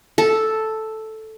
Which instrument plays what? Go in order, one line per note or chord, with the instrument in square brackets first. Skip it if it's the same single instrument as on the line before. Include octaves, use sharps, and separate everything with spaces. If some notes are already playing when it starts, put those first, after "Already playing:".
[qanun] A4